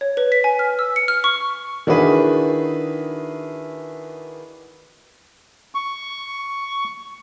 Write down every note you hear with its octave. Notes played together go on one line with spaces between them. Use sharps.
C#5
B4
B6
G#5
F6
E6
C#7
F6
C#6
D#3 D4 E4 F#4 G#4 B4
C#6